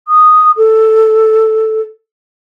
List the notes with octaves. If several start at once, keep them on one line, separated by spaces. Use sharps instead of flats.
D#6
A4